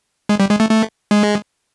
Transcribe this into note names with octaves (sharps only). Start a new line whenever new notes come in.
G#3
G3
G#3
A3
A3
G#3